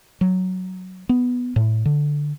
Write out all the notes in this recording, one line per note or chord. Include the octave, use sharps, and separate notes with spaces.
F#3
B3
A2
D3